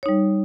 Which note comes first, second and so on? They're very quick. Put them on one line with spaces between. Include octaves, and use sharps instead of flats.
C#5 D#4 G3